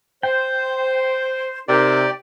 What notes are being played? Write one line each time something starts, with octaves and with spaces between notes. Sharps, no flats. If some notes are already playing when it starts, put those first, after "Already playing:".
C5 G5
C3 D#4 G4 A#4 D5